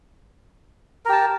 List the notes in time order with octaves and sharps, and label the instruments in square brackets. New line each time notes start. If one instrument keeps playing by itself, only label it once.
[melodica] A#4
G4
A5